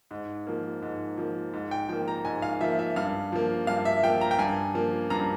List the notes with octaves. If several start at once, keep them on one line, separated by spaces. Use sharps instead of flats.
G#2
F3 A#3
G#2
F3 A#3
G#2
G5
F3 A#3 G5
A#5
G#2 G#5
F5
F3 A#3 E5
E5
G2 F5
F3 A#3
G2 F5
E5
F3 A#3 G5
A#5
G5
G2 G#5
F3 A#3
G2 A#5